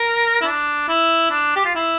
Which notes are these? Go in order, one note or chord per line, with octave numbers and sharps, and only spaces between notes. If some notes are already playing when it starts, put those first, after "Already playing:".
Already playing: A#4
E4
D4
E4
D4
G4
F4
E4